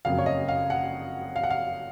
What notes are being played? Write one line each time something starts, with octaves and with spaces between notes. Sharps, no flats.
F#1 F2 C#3 F#3 A#3 F5
C#5
D#5
F5
F#5
F5
F#5
F5